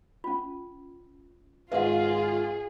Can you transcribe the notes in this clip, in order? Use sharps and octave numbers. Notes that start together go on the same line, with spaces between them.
C#4 F4
G#1 F4 G#4 B4 D#5 F5 F#5